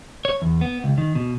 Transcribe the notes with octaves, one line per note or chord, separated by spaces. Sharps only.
C#5
E2
B3
C#2
D#3
B2